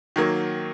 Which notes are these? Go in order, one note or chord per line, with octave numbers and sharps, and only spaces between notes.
D#3 F#3 A#3